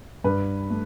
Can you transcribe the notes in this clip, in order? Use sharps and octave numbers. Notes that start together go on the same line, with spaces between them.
G2 B4
A3